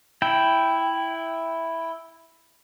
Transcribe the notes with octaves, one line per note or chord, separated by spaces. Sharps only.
E4 G5